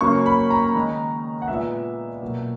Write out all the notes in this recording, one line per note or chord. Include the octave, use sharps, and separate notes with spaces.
C#3 F#3 A#3 C#4 C#6
B5
A#5
D#3 G#3 D#4
F#5
A#2 G#3 B3 E5
B2 F#3 A#3